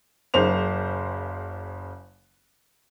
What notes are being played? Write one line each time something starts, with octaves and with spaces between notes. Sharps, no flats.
F#1 C#3 C5 F7